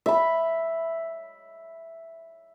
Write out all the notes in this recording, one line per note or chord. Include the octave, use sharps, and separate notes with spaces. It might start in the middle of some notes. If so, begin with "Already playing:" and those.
E5 B5